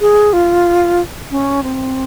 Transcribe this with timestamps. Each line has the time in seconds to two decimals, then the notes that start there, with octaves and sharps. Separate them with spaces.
0.01 G#4
0.33 F4
1.31 C#4
1.63 C4